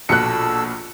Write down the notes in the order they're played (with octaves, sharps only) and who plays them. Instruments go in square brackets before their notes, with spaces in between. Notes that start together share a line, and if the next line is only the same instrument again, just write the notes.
[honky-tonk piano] A#1 B2 [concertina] A4 E6 [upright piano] F#6 C#7